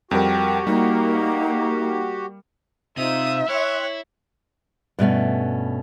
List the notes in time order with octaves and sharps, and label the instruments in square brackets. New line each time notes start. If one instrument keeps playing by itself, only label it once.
[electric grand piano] F2 G3 A#4 [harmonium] F#4 G4 [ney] G5
[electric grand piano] G3 [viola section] A#3 [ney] D#4
[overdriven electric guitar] C3 [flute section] D#4 F4 C5 [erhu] E5 [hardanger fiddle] D#6
[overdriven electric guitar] E4 [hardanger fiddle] C#5 [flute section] G5 C6 F#6
[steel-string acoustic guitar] G2 B2 A3 C#4